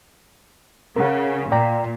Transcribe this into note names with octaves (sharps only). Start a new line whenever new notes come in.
C#3 A#4 F#5
A#2 D5 G5 A#5